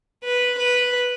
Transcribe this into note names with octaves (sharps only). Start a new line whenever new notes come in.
B4
B4